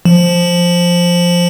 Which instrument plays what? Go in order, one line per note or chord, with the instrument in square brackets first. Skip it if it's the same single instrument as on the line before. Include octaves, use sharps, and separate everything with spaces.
[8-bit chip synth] F3